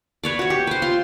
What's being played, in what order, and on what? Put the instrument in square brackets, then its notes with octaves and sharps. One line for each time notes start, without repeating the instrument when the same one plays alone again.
[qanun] B4 C#5 D5
F#4 C#5
G4
B4 C5
F4 C6